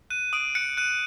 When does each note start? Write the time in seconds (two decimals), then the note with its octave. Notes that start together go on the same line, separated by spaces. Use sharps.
0.10 F#6 D#7
0.33 D#6 D7
0.55 F#6 C#7
0.77 F#6 D#7